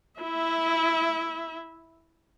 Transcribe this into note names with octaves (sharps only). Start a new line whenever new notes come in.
E4 E5